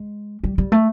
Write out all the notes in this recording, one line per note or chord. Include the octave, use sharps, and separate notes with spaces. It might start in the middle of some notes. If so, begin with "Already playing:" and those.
Already playing: G#3
G3
G3
A3